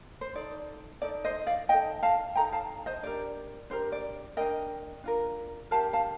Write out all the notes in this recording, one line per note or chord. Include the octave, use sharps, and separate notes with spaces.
C5
D#4 A4 D5
D#4 A4 D5
C5 D#5
D5 F5
D#4 A4 D#5 G5
F5 A5
D#4 A4 G5 A#5
F5 A5
C5 D#5
D4 G4 A#4 D5
D4 G4 A#4 C5
D5
D4 F4 A#4 D#5 G5
D4 F4 A#4
D4 G4 A#4 F5 A5
F5 A5